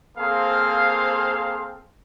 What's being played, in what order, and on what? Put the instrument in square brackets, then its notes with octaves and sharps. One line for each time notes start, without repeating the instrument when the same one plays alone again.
[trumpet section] A#3 C4 G#4 A4 C5 F5